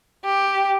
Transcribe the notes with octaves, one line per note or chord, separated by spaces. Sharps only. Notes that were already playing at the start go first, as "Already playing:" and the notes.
G4